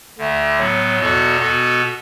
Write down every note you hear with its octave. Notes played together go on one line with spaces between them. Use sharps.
D2 D3 A3
A2 F#3 B3
E2 B2 B3 F#4 A4
B2 B3 F#4 A4